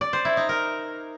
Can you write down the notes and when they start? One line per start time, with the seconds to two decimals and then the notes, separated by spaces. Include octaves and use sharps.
0.01 D5
0.13 C5
0.25 E4
0.37 D#4
0.49 A#4